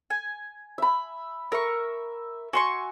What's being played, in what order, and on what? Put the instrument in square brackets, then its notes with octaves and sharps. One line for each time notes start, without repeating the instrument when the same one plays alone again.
[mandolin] G#5
[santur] E5 B5
[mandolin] A#4 C#6 [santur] E5
[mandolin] F#4 C6 C#6 [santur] G#5